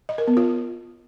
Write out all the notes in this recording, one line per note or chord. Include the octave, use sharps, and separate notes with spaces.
D#5
A#4
B3
F4